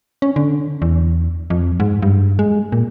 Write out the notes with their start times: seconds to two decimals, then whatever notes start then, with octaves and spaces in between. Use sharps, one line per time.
0.22 C#4
0.36 D3
0.82 E2
1.50 F2
1.80 G#2
2.02 G2
2.39 G#3
2.72 A#2